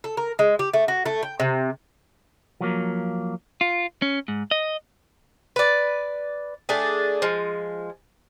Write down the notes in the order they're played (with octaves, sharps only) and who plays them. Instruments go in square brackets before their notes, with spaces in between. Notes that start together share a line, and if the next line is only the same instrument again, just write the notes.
[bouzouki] A4
A#4
G#3
G4
A3
F#4
A3
G5
C3
[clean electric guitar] F3 F#3 A#3
F4
C#4
G#2
D#5
[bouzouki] B4 D5
A3 D4 G#4
F3 G#3